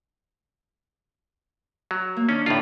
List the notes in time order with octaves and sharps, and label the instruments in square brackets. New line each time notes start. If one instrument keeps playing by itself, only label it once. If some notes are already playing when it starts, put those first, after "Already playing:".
[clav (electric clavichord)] F#3
[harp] A#3
[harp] D#3 D4 [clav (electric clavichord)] C#4
[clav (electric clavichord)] A2 F4 [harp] D3 D#3 D#4